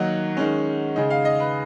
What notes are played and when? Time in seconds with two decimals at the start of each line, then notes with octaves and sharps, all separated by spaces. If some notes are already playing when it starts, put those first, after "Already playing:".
Already playing: D#3 F#3 A#3 D#4 F#5
0.37 D#3 G#3 C#4
0.96 C#3 G#3 D#4
1.10 F5
1.25 D#5
1.40 B4